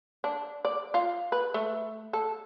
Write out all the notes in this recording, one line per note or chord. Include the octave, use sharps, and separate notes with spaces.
D4
D5
F4
B4
A3
A4